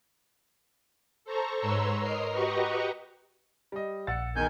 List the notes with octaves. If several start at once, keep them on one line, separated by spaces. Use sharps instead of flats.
A4 C5 A#5 C#6
G#2 B4 C#5 A#5 C6 E6
A#4 D#5 A#5 C7
F#4 G4 B4 D#5 A#5 C#6
G3 D#5
A#1 F#5 E6 A6 C#7
E2 D#3 G#5 G6